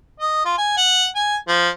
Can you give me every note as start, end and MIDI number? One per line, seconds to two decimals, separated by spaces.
0.20 0.44 75
0.45 0.54 65
0.58 0.76 80
0.77 1.06 78
1.15 1.36 80
1.48 1.69 53